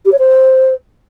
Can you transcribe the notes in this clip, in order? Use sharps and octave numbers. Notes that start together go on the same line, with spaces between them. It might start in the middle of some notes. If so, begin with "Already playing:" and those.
G4
C#5
C5